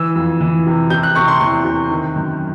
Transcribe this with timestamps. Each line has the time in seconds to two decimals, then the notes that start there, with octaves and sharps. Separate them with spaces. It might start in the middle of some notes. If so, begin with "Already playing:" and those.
Already playing: E3 E6
0.16 F2
0.41 E3
0.67 C3
0.90 C3 G6
1.03 F#6
1.16 C3 C#6
1.28 C6
1.40 E2 C#6
1.65 C3
1.91 D#3
2.16 F#2